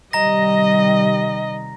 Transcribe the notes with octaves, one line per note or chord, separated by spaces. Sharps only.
C3 D#3 G3 D#5 A#5 A#6